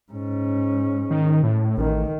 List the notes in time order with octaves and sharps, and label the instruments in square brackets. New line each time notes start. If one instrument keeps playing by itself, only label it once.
[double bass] G#2 C#4
[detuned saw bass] D#3
A2
[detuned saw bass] A1 [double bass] D#3